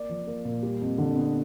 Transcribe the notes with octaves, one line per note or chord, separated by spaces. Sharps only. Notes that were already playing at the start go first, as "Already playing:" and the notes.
Already playing: A#3 D5
F3
A#3
A#2
G3
F2
D3
B3